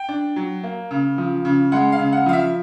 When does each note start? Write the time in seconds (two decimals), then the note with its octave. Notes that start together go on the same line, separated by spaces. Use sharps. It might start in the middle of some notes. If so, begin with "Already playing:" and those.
Already playing: G5
0.08 D4
0.36 F#3
0.63 A#3
0.91 C#3
1.18 F3
1.45 C#3
1.72 G#3 F#5
1.92 F5
1.99 C#3
2.13 F#5
2.26 F3 F5
2.33 E5